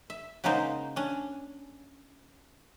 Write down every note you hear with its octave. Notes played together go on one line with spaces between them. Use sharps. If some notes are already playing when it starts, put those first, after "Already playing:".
E5
C#3 F#3 G#3 A#3 D#4 C5
C#4 D4